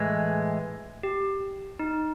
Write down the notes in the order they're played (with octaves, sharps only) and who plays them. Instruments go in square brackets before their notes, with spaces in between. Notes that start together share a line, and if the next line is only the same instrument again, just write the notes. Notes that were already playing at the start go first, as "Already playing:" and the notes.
Already playing: [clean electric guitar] A2 E3 G#3
[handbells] G4
D#4